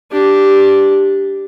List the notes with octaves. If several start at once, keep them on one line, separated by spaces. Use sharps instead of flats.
D4 G4